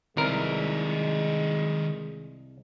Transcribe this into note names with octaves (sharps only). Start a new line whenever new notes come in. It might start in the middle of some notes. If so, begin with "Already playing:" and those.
C2 D#3 G#3 A#4 B4